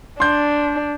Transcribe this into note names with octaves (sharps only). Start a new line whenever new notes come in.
D4 C6 G6